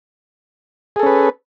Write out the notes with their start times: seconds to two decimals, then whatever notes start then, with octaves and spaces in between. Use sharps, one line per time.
0.96 G#4
1.00 A4
1.03 C#4
1.06 B4